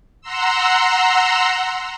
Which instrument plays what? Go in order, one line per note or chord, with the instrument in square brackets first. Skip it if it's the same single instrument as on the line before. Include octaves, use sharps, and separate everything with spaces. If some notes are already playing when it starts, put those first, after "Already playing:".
[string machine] F#5 A#5 C6 E6